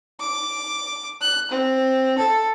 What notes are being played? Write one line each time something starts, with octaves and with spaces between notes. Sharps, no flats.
D6
F#6
C4
A4